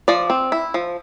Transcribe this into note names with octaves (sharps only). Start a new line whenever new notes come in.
F3 D5
C4
E4
F3